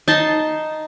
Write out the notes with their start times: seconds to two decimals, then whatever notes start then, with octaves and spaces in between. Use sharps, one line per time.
0.08 D#4 A5 C6